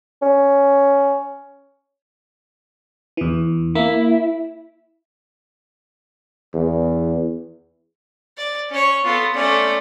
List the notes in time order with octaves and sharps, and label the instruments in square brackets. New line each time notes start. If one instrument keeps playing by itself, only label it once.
[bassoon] C#4
[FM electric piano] E2 E3
[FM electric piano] A#3 [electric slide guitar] E4
[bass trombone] E2
[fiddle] D5
C#4 C#5
[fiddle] B3 [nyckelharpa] F4 A4
[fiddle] A3 C#4 [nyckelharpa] C5 D5